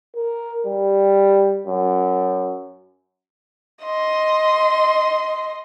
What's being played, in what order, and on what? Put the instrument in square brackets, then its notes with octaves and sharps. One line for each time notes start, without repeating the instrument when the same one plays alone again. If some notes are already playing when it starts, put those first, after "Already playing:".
[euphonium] A#4
G3
F#2
[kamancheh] D#5 C6